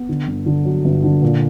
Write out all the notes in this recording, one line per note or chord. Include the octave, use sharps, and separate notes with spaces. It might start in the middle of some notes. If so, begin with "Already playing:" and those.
Already playing: B3
D3
G1
D3
F#3
G1
D3
A#2